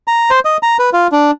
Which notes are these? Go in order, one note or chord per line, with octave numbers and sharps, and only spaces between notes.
A#5
C5
D#5
A#5
B4
F4
D4